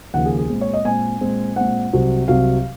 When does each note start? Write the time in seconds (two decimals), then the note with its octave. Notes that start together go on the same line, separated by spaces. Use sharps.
0.14 D#2 C#3 F3 A#3 F#5
0.26 G#4
0.38 G#4
0.50 A#2 G#3 C4
0.61 C#5
0.73 D#5
0.85 A#2 G#3 C4 G#5
1.21 A#2 G#3 C4
1.56 A#2 G#3 C4 F#5
1.93 C2 C3 F#3 C4
2.28 C2 C3 F#3 C4 F5